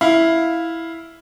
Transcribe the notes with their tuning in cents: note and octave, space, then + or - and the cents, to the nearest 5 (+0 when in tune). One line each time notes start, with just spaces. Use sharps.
E4 +0 F5 +0